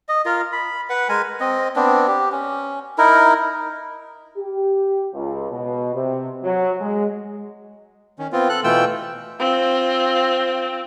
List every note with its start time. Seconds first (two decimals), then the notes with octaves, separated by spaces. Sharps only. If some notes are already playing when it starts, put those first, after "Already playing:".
0.09 D#5
0.25 F4 A#4
0.53 B5
0.90 B4 F#5
1.09 G#3 A#4 G#5
1.40 C4 D#5
1.76 B3 C4 D4
2.08 G4
2.32 C#4
2.98 D#4 E4 A#4
4.38 G4
5.14 C#2
5.52 B2
5.95 C3
6.43 F#3
6.81 G#3
8.19 D#3 C#4
8.32 B3 C4 F4
8.49 A4 F#6
8.64 B2 E3 A3 F4 G5 E6
9.40 C4 F4